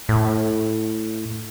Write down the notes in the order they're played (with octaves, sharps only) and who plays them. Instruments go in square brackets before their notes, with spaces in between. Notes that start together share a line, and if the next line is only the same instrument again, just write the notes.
[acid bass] A2